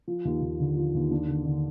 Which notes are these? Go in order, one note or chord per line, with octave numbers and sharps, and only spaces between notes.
F3
D#2
D#2
D3
F3
D#2
D4
D3
D3